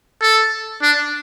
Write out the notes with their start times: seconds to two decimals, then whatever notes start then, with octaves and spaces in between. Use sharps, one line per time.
0.22 A4
0.82 D4